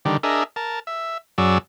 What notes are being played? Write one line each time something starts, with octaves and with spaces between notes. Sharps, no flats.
D3 D#3 G3
D4 G#4 A#4 D#5 E5
A#4 A5
E5
F#2 F#3 G#4 D5 E6